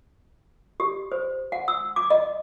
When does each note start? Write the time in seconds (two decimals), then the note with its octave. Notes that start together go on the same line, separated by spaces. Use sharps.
0.80 G4
1.12 C5
1.52 F#5
1.68 E6
1.96 D6
2.10 D#5